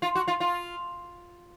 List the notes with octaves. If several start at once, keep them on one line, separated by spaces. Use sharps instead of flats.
F4
F#4
F4
F4